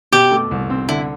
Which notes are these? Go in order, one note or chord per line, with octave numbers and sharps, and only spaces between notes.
B2 G4
A3
C2
C4
D3 E4